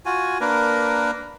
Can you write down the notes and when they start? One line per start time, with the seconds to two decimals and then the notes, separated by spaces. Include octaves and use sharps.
0.06 F4 F#4 G#5
0.41 A#3 D4 A#4 B4